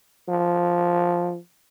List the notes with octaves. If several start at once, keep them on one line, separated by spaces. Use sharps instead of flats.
F3